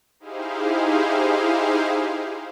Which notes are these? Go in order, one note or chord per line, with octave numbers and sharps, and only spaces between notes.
D#4 E4 G4 G#4 C5 F5